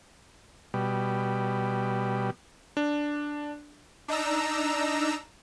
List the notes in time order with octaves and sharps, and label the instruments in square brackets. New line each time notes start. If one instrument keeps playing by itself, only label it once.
[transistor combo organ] B2 G3
[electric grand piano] D4
[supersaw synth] D4 D#4 A#5 E6